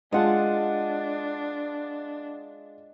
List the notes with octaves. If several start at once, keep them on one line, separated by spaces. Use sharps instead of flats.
G#3 D4 F4 D#5 F#5 A5